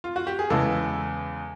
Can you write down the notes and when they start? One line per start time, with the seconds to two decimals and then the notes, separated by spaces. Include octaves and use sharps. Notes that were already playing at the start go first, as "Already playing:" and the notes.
0.04 F4
0.16 F#4
0.27 G4
0.39 G#4
0.50 E2 C#3 E3 G#3 A4